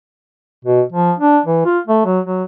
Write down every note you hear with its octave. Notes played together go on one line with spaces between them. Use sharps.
B2
F3
D4
E3
F4
A3
F#3
F#3